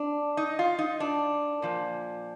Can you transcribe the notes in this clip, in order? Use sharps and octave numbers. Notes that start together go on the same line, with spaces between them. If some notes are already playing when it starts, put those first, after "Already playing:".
Already playing: D4
D#4
F4
D#4
D4
A#2 F3